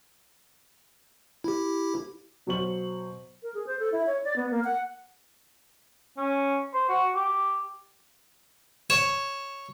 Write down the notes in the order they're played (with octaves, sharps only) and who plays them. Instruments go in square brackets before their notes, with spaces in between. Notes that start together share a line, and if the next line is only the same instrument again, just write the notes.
[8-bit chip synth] E4 G4
[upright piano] B2 F#3 F#4 C5 C#6 F#7
[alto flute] A#4
G#4
C5
A4
E4
C#5
D5
B3
A#3
F#5
[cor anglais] C#4
C5
F#4
G4
[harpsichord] C#5 [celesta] E7